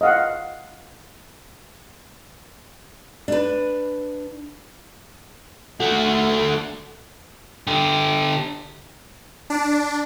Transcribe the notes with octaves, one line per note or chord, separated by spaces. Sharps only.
D#5 F5 F#5
D4 B4
A3 F#4
D3 G4
D4